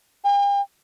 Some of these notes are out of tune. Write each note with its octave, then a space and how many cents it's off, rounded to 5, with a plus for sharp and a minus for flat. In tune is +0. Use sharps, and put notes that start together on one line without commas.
G5 +45